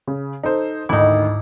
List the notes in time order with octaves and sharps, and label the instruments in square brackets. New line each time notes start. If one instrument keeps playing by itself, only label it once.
[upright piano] C#3
D#4 A4 C5
[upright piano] D2 D#3 [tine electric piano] G#2 D6 [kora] D#4 E4